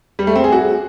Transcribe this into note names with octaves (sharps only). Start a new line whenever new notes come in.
G3
A3
C4
G#4
F#4